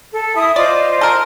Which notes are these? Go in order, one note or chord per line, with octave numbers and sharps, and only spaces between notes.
A4
E4 D#6
F4 C5 D5 D#5
A4 A#4